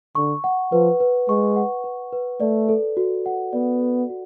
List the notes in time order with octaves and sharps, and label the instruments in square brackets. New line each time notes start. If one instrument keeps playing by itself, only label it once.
[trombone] D3 [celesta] C#6
[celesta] F#5
[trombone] F3 [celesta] B4
[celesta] B4
[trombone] G#3 [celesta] C#6
[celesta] F#5
B4
B4
[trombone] A3 [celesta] D5
[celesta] A4
F#4
F#5
[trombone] B3 [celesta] D5
[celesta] A4
F#4